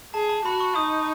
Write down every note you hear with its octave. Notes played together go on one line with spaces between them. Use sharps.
G#4 A5
A5
F#4 B5
C#6
D#4 D#6